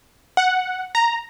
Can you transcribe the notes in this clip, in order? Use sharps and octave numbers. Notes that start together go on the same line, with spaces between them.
F#5
A#5